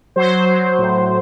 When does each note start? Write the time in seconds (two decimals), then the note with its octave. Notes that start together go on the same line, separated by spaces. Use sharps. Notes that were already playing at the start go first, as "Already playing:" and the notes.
0.16 F#3 C5
0.47 F#3
0.78 A2